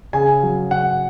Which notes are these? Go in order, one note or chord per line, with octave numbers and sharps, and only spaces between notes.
C#3 G#5
F#3
C#3 F#5